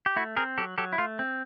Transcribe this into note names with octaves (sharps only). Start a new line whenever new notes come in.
G4
A3 E4 F#4
C4 G#4 A#4
F#3 G4 A4
F#3 G4 A4
E4
A3 F4
C4